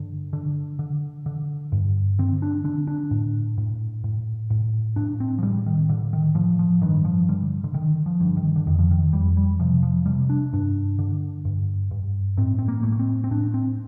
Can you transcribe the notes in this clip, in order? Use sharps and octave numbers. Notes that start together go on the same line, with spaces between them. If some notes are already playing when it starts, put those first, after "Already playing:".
Already playing: G2 D3
D3
D3
D3
G2
D3 C4
D4
D3 D4
D4
A2
A2
A2
A2
A2 D4
C4
F3
A2 G3
D#3
A2 D3
D#3
A2 F3
F3
G2 D#3
F3
D3 G3
D3
D3 D#3
F3
G2
D#3
D3
F2 D#3
F3
D#3
F2 G3
G3
C3 F3
F3
C3 G3
D4
G2 D4
D3
G2
G2
A2 C4
C4
A#3
A2 A3
A#3
C4
C4
A2 D4
C4